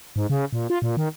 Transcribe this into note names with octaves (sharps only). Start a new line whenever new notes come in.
G#2
C#3
A#2
F4
A#2
D#3